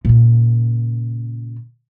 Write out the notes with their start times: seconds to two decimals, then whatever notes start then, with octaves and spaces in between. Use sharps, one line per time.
0.05 A#2 C#3